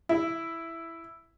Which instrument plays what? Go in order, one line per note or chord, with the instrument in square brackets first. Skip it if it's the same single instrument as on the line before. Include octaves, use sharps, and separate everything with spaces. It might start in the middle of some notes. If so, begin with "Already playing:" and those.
[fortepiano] E4